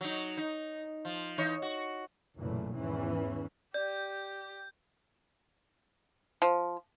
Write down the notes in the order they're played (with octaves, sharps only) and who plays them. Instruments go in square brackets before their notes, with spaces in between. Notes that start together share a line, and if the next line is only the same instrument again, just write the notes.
[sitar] F#3 D#4
D#4
F3
E3 D#4 C#5
F#4
[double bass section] B1 F#2 A#2 C#3 E3 A3
E2 G#2 D#3 E3 C#4
[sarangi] G4 [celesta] D5 [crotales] G6
[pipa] F3